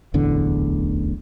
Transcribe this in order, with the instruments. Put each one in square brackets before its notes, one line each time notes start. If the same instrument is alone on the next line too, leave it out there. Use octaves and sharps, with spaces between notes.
[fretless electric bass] D1 A1 E2 D3